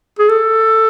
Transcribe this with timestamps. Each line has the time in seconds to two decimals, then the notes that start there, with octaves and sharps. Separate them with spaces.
0.19 G#4
0.28 A4